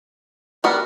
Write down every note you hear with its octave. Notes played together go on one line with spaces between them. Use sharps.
G3 B3 D4 F#4 A#4